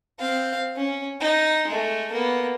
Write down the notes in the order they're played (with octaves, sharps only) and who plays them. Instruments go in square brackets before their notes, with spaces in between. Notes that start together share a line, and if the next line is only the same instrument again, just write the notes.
[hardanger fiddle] C4 F5
C#4
D#4
G#3 A3
A#3 B3